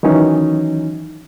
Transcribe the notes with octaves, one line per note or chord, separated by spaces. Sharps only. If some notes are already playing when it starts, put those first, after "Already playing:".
D#3 E3 F#3 C#4 D#4